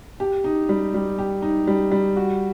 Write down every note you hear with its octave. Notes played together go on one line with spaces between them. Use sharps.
G4
D#4
G3
G3
G4
D#4
G3
G3
F#4